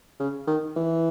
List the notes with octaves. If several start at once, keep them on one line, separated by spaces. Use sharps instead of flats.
C#3
D#3
E3